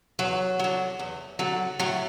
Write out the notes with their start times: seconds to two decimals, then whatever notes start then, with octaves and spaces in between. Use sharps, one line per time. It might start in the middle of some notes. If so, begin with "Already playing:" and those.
0.19 E2 F#3
0.59 D3 F#3
0.99 E2
1.39 D3 F#3
1.80 A2 F#3